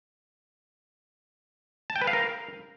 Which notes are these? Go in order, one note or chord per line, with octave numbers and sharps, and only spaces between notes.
A5
G5
B4
F5
A#4